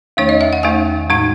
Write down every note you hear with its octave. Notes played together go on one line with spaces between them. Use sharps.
E2 D#3 A3 D#4 C#5
D#5
E5
F#5
E2 D#3 A3 D#4 G#5
A2 G#3 D#4